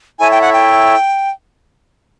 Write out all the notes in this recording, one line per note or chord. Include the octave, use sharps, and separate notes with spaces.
E4 A4 C#5 E5 G#5
G5
F#5
G5